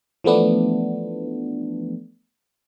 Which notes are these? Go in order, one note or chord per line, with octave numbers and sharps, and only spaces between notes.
E3 F3 A3 B3 D4